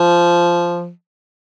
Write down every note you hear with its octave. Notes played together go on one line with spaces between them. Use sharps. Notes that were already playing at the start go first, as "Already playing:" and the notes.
Already playing: F3